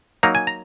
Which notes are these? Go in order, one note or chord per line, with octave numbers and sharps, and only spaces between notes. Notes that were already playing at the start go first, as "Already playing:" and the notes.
F#3 A#3 D#4 A#5
G#5
A#5